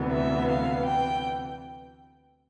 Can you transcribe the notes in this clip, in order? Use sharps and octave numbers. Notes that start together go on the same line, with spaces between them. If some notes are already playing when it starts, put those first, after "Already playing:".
Already playing: D2 C3 E3 B3
E5
F5
G5